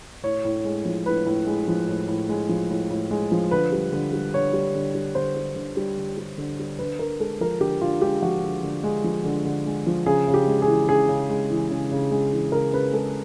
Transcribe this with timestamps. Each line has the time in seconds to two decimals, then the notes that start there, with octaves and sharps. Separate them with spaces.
0.23 A2 C#5
0.45 A2
0.65 G#3
0.85 F3
1.06 A2 B4
1.26 A2
1.46 G#3
1.68 F3
1.88 A2
2.08 A2
2.29 G#3
2.49 F3
2.70 A2
2.91 A2
3.11 G#3
3.32 F3
3.51 D3 B4
3.72 G3
3.93 D3
4.13 G3
4.34 D3 C#5
4.53 G3
4.75 D3
4.95 G3
5.15 D3 C5
5.36 G3
5.56 D3
5.77 G3
5.98 D3
6.18 G3
6.38 D3
6.59 G3
6.79 D3 B4
6.99 D3 A#4
7.20 G#3 A4
7.41 F3 A#4
7.61 D3 G4
7.81 D3 F4
8.02 G#3 G4
8.22 F3 F#4
8.43 D3
8.63 D3
8.84 G#3
9.04 F3
9.25 D3
9.45 D3
9.66 G#3
9.87 F3
10.06 C#3 G#4
10.28 C#3
10.34 G4
10.47 G#3
10.62 G#4
10.68 E3
10.89 C#3 G#4
11.09 C#3
11.30 G#3
11.50 E3
11.71 C#3
11.91 C#3
12.11 G#3
12.32 E3
12.52 C#3 A#4
12.73 C#3 B4
12.93 G#3 A4